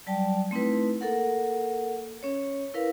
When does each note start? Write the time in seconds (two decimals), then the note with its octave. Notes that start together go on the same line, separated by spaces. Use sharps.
0.07 F#3 G3 D5 G5 A5
0.51 A3 C4 D#4 E4 B4
1.01 A#3 A4 A#4 F#5
2.23 C#4 C#5
2.74 E4 A#4 B4 F5